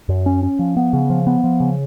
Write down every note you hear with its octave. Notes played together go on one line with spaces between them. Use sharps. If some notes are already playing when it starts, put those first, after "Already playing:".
F#2
C#4
C#4
F3
B3
C#3
F3
B3
F3
C#3